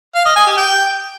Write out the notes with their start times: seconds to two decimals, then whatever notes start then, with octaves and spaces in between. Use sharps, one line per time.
0.15 F5
0.25 D#5
0.36 G#5
0.47 G4
0.57 G5